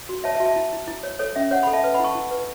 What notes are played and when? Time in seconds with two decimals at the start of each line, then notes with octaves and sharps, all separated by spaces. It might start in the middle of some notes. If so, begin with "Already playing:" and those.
0.09 F#4
0.24 C#5 E5 A5
0.34 E5 A5
0.40 F#4
0.46 E5 A5
0.56 E4
0.73 E4
0.87 E4
1.03 C#5
1.19 A4 C#5
1.36 C#4 E5
1.51 C#5 F#5
1.63 F#5 B5
1.67 A4
1.73 E5 A5
1.84 B4
1.95 F#5 B5
2.00 E4 A5 C#6
2.15 E4
2.31 B4